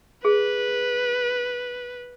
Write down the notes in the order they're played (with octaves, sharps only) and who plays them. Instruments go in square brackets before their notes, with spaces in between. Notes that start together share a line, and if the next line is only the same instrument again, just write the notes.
[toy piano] G#4 [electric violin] B4